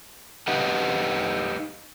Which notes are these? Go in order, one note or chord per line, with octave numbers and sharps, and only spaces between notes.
D#4 G4 B4 D#5 F#5